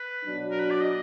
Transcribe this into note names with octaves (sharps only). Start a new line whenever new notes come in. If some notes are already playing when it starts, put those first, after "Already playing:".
Already playing: B4
B2 F#3 D4
A#4
B4
D5
D#5